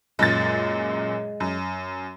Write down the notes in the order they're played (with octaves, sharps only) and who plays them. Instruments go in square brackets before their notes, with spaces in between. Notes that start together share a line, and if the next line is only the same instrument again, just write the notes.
[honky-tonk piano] F#2 A#2 A6 [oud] G#3
[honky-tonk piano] F#2